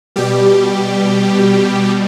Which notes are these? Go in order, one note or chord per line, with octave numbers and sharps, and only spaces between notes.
B2 G3 G4